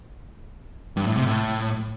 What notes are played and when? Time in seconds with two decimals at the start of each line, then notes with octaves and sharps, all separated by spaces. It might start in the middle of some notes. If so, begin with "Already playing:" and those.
0.97 G2
1.07 A2
1.17 C3
1.27 A2